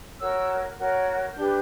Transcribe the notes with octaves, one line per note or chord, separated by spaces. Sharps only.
F#4 A#4 C#5 E6
F#4 A#4 C#5
D4 G4 B4 G6